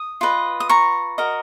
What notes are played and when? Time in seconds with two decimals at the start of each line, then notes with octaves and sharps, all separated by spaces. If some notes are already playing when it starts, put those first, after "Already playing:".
Already playing: D#6
0.21 F4 B4 D#5
0.60 D#6
0.69 A#5 C#6
1.18 F#4 A#4 D#5